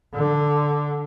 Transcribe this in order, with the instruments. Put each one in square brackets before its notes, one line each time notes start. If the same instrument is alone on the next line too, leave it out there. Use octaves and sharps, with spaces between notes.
[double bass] D3